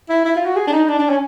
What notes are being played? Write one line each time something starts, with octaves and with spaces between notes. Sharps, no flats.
E4
E4
F4
F#4
G#4
D4
D#4
D4
D4
C#4